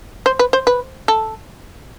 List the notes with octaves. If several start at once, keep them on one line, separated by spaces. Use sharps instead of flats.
C5
B4
C5
B4
A4